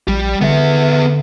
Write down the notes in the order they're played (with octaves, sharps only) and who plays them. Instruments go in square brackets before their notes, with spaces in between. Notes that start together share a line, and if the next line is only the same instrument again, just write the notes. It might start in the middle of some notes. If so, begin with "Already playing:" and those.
[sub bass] A#1 [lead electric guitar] G3 G4
[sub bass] D3 [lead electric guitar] B3 E5